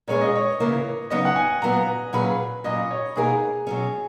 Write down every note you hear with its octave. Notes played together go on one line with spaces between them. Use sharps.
A#2 G#3 C#4 G#4 B4 C#5
D#5
C#5
C#3 E3 A#3 E4
C#3 F#3 B3 D#4 D#5
F#5
G#5
A#2 F#3 B3 F#4 A#5
A#2 F#3 C#4 G#4 B4 B5
A#2 F#3 C#4 D#5
C#5
B2 A#3 D#4 G#4 A#4
B2 F#3 C#4